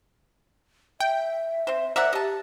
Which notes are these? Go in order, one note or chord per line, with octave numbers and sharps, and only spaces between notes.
E5 G5
C4 C5
A#4 C5 D5 E5 F#5
G4 D#5 A5